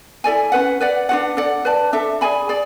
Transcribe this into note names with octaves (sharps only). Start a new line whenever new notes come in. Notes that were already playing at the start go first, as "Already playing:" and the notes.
E4 A4 D5 G#5
C#4 F#4 B4 F#5
B4 D5 F#5
D4 F#4 B4 F#5
D4 A4 D5 F#5
B4 D5 A5
D4 A4 E5
G#4 D5 G#5 B5
G#4 D5